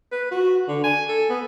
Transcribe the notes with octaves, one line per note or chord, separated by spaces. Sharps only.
B4
F#4
D3
G#5
A4
B3